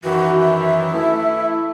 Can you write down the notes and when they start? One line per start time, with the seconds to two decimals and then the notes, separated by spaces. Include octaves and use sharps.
0.04 F#2 D#3 E3 F#4
0.41 E5
0.93 A3 E4